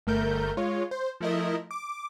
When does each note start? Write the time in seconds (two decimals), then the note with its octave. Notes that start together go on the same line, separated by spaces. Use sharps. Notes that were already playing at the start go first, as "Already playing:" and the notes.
0.07 G1 A3 A#4 G6
0.57 G#3 F4 C#5
0.91 C5
1.21 F3 A3 E4 A#4 D#5
1.71 D6